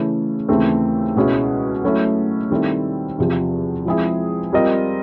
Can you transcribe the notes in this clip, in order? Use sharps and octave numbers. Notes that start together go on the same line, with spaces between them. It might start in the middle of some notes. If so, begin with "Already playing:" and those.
Already playing: C#3 E3 A3 C#4 E4
D#2 C#3 E3 A3 C4
C#2 B2 G#3 C#4 E4
F#3 A3 C#4 E4 A4
D#3 G3 C4 E4 A4
E2 C3 F3
F3 G#3 C4 E4 G#4
G3 C4 F4 A#4 D#5